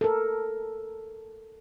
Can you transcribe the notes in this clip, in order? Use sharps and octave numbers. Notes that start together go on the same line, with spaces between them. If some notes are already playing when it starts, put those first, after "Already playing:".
A4 A#4